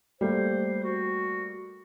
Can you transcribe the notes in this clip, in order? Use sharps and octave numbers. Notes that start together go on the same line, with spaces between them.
G3 A3 A#3 C5
F#4